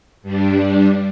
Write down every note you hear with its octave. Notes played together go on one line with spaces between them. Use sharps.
G2 G3 D4